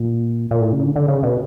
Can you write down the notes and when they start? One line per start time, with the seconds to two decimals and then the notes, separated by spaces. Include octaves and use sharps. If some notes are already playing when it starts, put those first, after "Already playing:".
Already playing: A#2
0.51 A#2
0.61 A2
0.72 C#3
0.84 D3
0.96 D3
1.08 C#3
1.23 B2